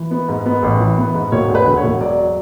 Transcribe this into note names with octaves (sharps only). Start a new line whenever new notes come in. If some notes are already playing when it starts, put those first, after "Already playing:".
Already playing: E3
B3
G#2
B3
A1
E3
B3
G#2
E1 C#5
D2
B4
D3
C#5
E1
F#3 D5
F#3